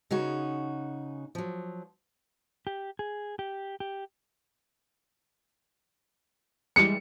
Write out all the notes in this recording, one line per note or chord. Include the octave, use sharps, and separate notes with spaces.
C#3 C#4 D#4 F#4
F3 F#3
G4
G#4
G4
G4
E3 G3 G#3 C#7